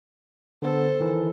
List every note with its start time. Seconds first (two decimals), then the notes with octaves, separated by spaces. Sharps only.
0.62 D3 B3 A4 C5
1.00 D#3 E3